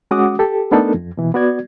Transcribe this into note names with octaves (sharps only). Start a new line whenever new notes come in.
G#3 C#4 F#4 F#5 D6 D#6
G4 A4
A3 B3 D4 D#4 A4 A#4
F2
B2 E3
B3 F#4 D5 G#6